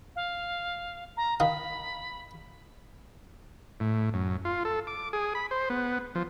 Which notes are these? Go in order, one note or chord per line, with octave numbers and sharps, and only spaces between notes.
F5
A#5
D#3 F5 B5 D#6
A2
F#2
F4
A4
D6
G#4
B5
C5
B3
F3